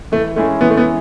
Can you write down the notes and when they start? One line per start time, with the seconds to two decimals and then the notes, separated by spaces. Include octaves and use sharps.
0.12 E3 A3
0.36 G#3 A3 C#4 E4 G#4
0.61 E3 B3
0.70 A3
0.77 B3
0.85 G#4